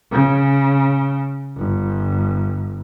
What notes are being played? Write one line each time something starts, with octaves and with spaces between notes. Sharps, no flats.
C#3
G1